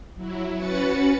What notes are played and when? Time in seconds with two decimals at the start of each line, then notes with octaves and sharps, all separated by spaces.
0.15 F#3 E4
0.54 C#4 F#4 B4 A6 C#7